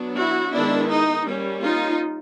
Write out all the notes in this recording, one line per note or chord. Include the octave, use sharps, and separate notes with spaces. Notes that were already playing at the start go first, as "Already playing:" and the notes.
Already playing: F#3 B3 D4
E4 F#4
D#3 G#3 B3 D4 E4
D#4
G3 A#3 C#4
D#4 F4